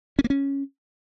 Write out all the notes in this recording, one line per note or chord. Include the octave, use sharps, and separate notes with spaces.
C#4
A#3
C#4